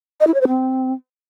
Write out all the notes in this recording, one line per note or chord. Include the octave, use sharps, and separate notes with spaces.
D#5
E4
C#5
C5
C4